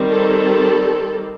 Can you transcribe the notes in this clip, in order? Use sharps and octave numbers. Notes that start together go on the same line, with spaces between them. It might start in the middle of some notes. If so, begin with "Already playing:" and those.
Already playing: D#3 G3 C4
A4